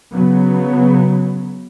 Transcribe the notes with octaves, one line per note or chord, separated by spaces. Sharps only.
C#3 F#3 B3